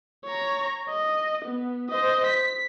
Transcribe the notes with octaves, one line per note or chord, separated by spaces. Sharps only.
C#5 A#5
D#5
B3
C5 D#5
B6